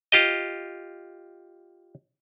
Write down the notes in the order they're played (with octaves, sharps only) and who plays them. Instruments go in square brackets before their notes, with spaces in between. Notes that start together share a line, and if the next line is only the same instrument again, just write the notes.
[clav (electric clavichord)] F4 G4 D#5